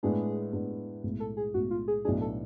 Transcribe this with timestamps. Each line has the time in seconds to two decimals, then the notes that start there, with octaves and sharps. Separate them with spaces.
0.03 A2 G#3 B3 D4 G#4
0.53 A2 G#3 B3 D4
1.03 B1 A2 G#3
1.20 A4
1.37 G#4
1.54 B1 A2 G#3 F#4
1.71 F4
1.88 G#4
2.05 B1 A2 F#3 B3 D4 G#4
2.21 A4